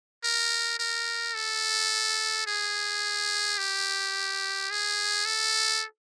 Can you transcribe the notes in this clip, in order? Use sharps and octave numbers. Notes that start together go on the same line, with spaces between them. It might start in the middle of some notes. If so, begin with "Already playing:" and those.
A#4
A#4
A4
G#4
G4
G#4
A4